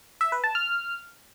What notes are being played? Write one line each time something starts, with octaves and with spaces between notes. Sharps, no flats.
E5
B4
A5
F6